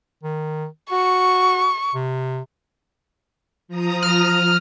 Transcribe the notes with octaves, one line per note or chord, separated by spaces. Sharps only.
D#3
F#4 C#6
C3
F3 A#5 D#6
F6